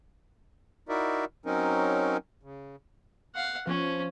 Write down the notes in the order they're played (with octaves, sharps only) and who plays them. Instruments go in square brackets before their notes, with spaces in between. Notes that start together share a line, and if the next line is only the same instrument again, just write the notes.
[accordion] D#4 E4 F#4 A#4 D5 E5
F#3 C4 C#4 D#4 A#4
C#3
[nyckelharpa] F5 F#5
[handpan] F3 [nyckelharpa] C#4